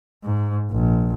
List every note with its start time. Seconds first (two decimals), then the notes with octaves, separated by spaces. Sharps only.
0.24 G#2
0.71 A#1